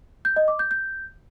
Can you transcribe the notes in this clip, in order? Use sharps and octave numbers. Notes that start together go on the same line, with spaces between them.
G6
D#5
D6
G6
G6